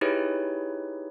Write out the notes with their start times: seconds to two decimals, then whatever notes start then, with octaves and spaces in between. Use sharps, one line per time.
0.01 D#4 E4 G4 G#4 B4 C#5